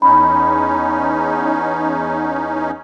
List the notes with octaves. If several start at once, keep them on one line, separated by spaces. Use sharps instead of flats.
E2 C#4 D#4 B5